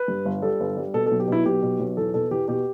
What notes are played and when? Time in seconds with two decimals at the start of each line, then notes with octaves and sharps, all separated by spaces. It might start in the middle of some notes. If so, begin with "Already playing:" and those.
Already playing: B4
0.08 G2
0.25 G1
0.42 G3 A4
0.60 G1
0.77 G3
0.94 B2 A4
1.06 A4
1.11 B1
1.20 G4
1.28 B2 E4
1.45 B1 G4
1.63 B2
1.80 B1
1.97 E2 A4
2.14 B2 A4
2.31 E2 G4
2.48 B2 G4